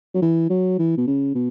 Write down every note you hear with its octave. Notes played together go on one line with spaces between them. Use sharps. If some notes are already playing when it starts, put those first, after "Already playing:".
F#3
E3
F#3
E3
B2
C#3
B2